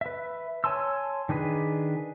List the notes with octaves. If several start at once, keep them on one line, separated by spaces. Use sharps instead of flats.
B4 E5
C#5 G#5 A5 C6 E6
D#3 D4 G#4 B4